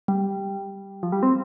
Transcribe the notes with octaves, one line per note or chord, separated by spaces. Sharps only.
G3
F3
G3
C4